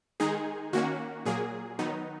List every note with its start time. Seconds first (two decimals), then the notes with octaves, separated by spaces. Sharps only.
0.20 D#3 G#3 D#4 G#4
0.73 D#3 A#3 C#4 F#4
1.26 A#2 F#3 A#3 G#4
1.79 D#3 F#3 B3 D#4